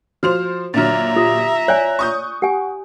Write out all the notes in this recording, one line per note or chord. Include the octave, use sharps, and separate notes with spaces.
F3 F#4 C5 F6 F7
A#2 D3 F#3 E5 A#5 F6 A6
F4 G4 D#6 A#6
C#5 D5 G#5 F#6
C#6 D#6 G6
G4 F#5 G#5